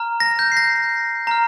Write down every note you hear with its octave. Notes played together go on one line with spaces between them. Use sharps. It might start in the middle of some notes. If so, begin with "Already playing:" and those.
Already playing: A#5 F6
A#6
G6
C7
A#6
A#5 F6